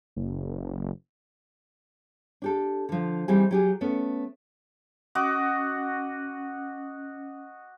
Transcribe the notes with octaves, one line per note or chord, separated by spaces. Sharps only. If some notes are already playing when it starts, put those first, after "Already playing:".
F#1
D4 G4 A4
D3 F3
E3 G3 C4 D#4 G4 G#4
F#3 G4 G#4
A3 B3 C#4
C#4 F#4 D#5 D6